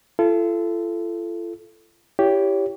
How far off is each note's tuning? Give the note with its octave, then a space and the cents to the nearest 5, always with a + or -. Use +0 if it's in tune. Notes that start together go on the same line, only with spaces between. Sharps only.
F4 -40 A4 -5
E4 +15 G4 +0 C#5 +25